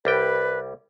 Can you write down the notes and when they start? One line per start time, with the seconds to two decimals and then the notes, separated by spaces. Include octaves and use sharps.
0.05 C2 G3 B4 G5